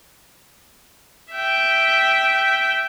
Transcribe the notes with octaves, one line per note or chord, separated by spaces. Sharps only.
E5 G5